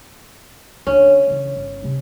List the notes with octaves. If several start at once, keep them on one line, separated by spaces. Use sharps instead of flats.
D2 C#4 D4
C#3 E3
G1
C3 A3